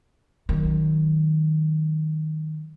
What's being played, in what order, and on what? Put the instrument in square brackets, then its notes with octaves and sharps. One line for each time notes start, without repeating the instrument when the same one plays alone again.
[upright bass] D#3 F#3